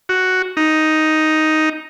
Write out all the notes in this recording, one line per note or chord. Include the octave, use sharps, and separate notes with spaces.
F#4
D#4